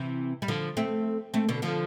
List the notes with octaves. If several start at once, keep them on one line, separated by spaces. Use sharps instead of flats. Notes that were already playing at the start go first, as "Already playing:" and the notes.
Already playing: C3 E3
G3
D3 F3
A3 C4
A3 C4
B2 D3
D3 F3